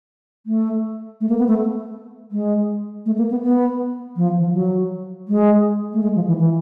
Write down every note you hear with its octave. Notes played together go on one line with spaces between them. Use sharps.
A3
A3
A#3
B3
A3
G#3
A3
A#3
B3
B3
F3
E3
F3
F#3
G#3
A3
G#3
F3
E3
E3